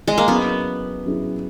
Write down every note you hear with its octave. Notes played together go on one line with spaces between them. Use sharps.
G#3
A#3
F#3 B3 C#4 E4 G#4
F#3 C#4 E4 G#4